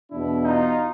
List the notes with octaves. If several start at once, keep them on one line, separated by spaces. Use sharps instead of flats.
E2 B2 D4 E4
D#4 F4